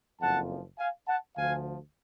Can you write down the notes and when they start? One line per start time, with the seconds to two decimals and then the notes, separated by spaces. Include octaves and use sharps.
0.21 F#1 F2 F3 F#5 A5
0.79 F5 G#5
1.08 F#5 A5
1.37 D2 D3 F3 F5 G#5